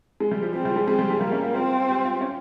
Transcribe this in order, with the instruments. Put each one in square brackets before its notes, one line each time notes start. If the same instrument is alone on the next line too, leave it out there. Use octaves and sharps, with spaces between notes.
[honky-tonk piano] G#3
G3
F3
[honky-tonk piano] F3 [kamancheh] C4
[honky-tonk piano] G3
G#3
[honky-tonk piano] G#3 [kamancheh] C4
[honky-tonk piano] G3
G#3
[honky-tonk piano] G3 [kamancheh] A#3
[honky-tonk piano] C#4
[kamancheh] C4 [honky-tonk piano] F4
[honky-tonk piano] G4
F4
C#4